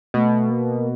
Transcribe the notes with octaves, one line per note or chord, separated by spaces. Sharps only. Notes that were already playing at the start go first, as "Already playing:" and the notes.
B2 A3
A#3